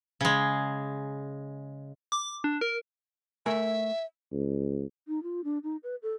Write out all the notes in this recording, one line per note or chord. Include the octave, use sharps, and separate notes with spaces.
C#3 G#3
D6
D4
A#4
A3 A#4 E5 G#5
C#2
D#4
F4
D4
D#4
B4
A4